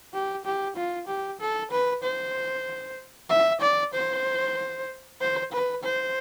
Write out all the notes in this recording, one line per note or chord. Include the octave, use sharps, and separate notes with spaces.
G4
G4
F4
G4
A4
B4
C5
E5
D5
C5
C5
B4
C5